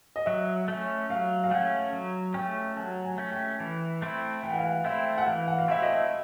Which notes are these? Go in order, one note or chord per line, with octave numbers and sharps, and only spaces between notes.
D#5
F#3 E5
A3 C#4
F#3 F5
F5
A3 C#4 F#5
F#3
A3 C#4 G5
F#3 A5
G#5
A3 C#4
G5
E3
A3 C4 E4
E3 G5
F#5
F5
F#5
A3 C4 E4 E5
F#5
E3 F5
F#5
F5
A3 C4 E4 E5
D#5